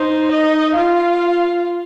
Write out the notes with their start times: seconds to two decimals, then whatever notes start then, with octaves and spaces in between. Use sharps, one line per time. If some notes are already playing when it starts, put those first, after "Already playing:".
Already playing: D#4 C5
0.32 D#5
0.76 F4 F5